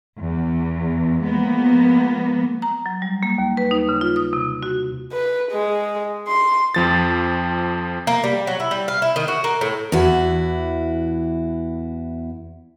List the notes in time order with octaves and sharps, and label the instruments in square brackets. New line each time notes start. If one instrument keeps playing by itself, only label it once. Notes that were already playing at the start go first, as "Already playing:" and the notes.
[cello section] E2
F3 G#3 A#3 B3
[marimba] A#5
F#3
G3
A#3
D#2
B4
D#4
C#3
F4
D#6
C3
F#4
[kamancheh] B4
G#3
C6
[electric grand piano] F2 F3 A6
[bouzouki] A#3
G3
F#3
E4
G3
F5
E4
D#3
F#4
A#3
A2
[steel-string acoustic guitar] E2 E3 E4 F#4